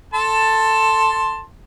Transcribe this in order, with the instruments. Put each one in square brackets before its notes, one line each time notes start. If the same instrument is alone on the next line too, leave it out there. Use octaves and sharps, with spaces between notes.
[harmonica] A4 A5 C6